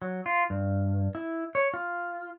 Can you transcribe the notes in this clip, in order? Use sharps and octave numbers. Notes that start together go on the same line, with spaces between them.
F#3
F4
G2
E4
C#5
F4